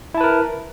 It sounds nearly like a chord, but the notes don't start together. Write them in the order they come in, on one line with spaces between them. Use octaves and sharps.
E4 A5 B4 A#4